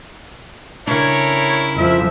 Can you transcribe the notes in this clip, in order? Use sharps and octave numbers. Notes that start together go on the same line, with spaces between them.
C#3 A3 D4 E4 A#4 C#5
F2 F3 E5